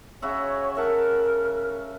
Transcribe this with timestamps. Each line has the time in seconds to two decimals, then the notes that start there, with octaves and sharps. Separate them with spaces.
0.22 C#3 F#4 C#5 E5
0.77 A#4 E5 F#5 A5